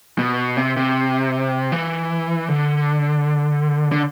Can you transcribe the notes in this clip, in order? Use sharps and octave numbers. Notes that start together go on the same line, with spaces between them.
B2
C3
C3
E3
D3
D3